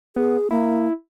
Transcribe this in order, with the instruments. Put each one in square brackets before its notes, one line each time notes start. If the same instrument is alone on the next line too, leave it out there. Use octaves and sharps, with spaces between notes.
[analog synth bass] B3 [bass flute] G#4
[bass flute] A#3 [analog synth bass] E4